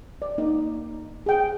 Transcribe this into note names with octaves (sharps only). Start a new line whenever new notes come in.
D5
A#3 D#4
G#4 G5